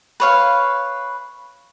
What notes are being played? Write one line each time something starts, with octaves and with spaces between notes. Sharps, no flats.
B4 C#5 F5